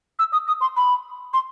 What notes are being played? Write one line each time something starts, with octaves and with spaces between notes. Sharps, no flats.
E6
D#6
D#6
C6
B5
C6